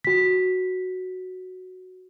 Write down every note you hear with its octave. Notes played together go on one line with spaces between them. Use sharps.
F#4 B6